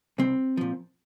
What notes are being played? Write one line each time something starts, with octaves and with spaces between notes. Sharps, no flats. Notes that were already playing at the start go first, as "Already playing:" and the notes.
C2 C4
A#2 F3